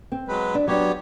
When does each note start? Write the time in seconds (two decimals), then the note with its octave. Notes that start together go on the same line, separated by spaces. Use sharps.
0.12 C4
0.28 F#3 G#3 B4
0.55 D4
0.67 F#3 B3 D4 G4 C#5